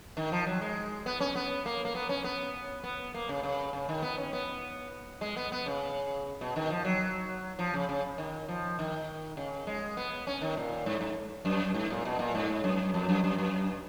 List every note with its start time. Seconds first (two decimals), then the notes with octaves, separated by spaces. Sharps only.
0.17 D#3
0.32 F3
0.46 F#3
0.61 G#3
1.06 B3
1.20 C#4
1.35 B3
1.66 A#3
1.85 A#3
1.95 B3
2.09 C#4
2.24 B3
2.84 B3
3.14 A#3
3.29 C#3
3.43 C#3
3.73 C#3
3.89 D#3
4.02 B3
4.18 C#4
4.33 B3
5.21 G#3
5.37 B3
5.52 B3
5.66 C#3
6.41 B2
6.56 D#3
6.70 F3
6.84 F#3
7.59 F3
7.74 C#3
7.89 C#3
8.18 D#3
8.49 F3
8.79 D#3
9.37 C#3
9.67 G#3
9.97 B3
10.27 C#4
10.42 D#3
10.57 A#2
10.86 G#2
11.01 G#2
11.45 F#2
11.74 G#2
11.90 A#2
12.05 B2
12.19 A#2
12.35 G#2
12.64 F#2
12.94 F2
13.09 F#2
13.24 F#2
13.38 F#2